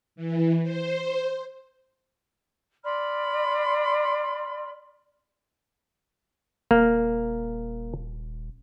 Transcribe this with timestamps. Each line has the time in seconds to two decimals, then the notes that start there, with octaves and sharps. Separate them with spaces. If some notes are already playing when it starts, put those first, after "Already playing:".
0.16 E3
0.63 C5
2.84 D5 B5 C6 F6
6.71 D#1 A#3